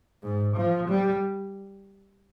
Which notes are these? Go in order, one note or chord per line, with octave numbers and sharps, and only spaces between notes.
G#2
F3
G3